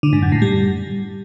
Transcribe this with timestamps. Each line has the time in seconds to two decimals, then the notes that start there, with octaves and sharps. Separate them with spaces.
0.03 D3
0.13 G#2
0.22 F#2
0.32 A2
0.42 G3